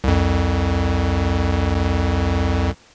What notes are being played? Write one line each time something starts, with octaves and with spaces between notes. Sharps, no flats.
C2 F2